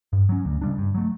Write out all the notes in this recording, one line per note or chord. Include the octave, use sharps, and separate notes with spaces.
G2
F#3 C#4
D2
C#3 G3 D4
G2
F#3 A3